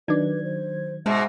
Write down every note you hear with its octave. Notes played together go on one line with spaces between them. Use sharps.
D#3 F#3 D4 D#4 B4 D5 G#6
C5
G#2 B2 G#3 E5